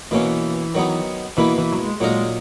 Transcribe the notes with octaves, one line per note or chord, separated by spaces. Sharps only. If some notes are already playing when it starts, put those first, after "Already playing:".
B2 E3 A#3 C#4
D#3 F#3 B3 D#4
B2 E3 A#3 E4 B4
E3
F#3
G#3
A#2 F#3 G#3 A#3 D#4 A#4